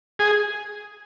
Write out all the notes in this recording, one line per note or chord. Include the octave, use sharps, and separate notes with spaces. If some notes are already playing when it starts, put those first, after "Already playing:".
G#4